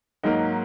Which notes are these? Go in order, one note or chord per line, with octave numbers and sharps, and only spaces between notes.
G#2 F#3 A#3 D#4